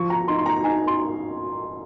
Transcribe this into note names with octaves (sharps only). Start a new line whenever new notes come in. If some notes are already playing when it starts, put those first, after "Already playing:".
Already playing: F3 C#6
A#5
D#4 C6
C6
A#5
D#4 G#5
C6